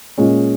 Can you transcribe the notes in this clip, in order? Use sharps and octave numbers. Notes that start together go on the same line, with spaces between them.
A#2 G#3 C#4